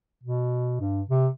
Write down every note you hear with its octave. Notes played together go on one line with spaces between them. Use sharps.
B2
G2
C3